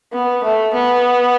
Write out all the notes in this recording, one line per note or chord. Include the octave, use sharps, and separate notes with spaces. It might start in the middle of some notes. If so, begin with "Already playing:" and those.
B3
A3
B3